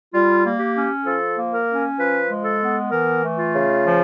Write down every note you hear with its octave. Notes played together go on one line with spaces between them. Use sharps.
G3 F4
A#3
G4
C#4
F3 A4
A#3
A#4
C#4
F3 B4
G#3
A4
B3
E3 A#4
A3
F4
C#3
F3